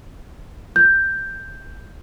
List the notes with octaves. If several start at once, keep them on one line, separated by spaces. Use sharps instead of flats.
G6